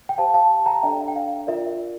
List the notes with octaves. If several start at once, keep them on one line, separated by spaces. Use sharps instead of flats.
G5
G4 C5 F5 A5
F5 A5
G5 A#5
D4 A4 D5 E5 G5
G5
F5
F4 A#4 D5 E5